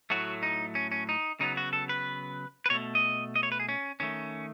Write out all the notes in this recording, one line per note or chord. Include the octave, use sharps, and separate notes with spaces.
A2 F#3 A3 F#4
D#4
C#4
C#4
D#4
C#3 F#3 B3 D#4
F#4
A4
B4
B4
B2 A3 C#5
D#5
D#5
C#5
B4
G#4
C#4
D#3 A3 C#4